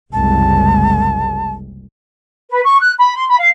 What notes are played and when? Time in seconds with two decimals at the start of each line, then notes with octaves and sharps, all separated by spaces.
0.13 F#1 C2 G#3 A5
2.50 B4
2.64 C#6
2.80 F#6
2.99 B5
3.16 C6
3.28 B5
3.39 F5